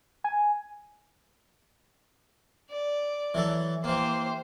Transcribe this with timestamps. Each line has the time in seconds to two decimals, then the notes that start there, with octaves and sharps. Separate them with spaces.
0.24 G#5
2.71 D5
3.34 E3 F#3 A4
3.84 E3 A#3 G4 C5